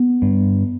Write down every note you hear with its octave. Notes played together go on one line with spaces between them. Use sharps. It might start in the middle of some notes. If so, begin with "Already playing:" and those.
Already playing: B3
G2